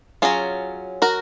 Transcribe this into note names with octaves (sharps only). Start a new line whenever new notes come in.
F#3 C#4 F4 G#4
F#4 A#4